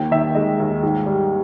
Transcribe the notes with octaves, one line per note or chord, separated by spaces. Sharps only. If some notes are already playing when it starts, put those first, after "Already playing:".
Already playing: D#2 A#3 G5
D#3 E5
G#3 D#5
D#2
G#2
G3